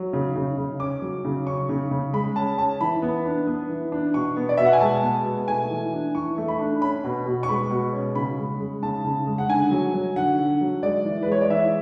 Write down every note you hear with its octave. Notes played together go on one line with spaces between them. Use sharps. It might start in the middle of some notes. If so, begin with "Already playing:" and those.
Already playing: F#3
C#3
C#3
C#3
C#4 D6
F#3
C#3
C#4 C#6
C#3
C#3
G#3 B5
C#4 A5
C#4 A5
E3 B5
B3
D4
B3
E3
D4
B2 C#6
B3
D5
B2 E5
F#5
G#5
G#3 A5
B3
B2
A3 G#5
E3
D4
E3 C#6
A3
B5
D4
C#4 B5
B2
B2
C#6
G#3 B5
B2
C#4
C#3 B5
G#3
G#3
C#3 A5
C#3
G#3
F#5
D3 G#5
F#3
F#3
D3 F#5
D3
F#3
G#3 D5
E3
B4
G#3 C#5
D5
E3 E5